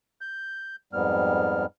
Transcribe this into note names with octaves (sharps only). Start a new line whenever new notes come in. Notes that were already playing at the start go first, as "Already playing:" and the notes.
G6
F2 G#2 G3 B3 F6